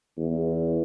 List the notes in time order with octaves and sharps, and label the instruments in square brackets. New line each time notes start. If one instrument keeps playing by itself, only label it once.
[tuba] E2